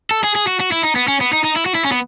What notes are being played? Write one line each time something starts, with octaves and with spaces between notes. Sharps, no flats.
A4
G#4
G#4
F#4
F#4
E4
D#4
B3
C#4
B3
D#4
D#4
E4
F#4
E4
C#4
B3